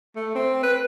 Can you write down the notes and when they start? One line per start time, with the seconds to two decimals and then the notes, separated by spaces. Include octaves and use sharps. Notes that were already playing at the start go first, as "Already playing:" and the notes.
0.16 A3
0.35 C4
0.63 B4